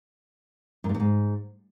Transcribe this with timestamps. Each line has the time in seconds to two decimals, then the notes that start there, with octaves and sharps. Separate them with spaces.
0.84 F#2
0.89 G2
0.94 E2
1.00 G#2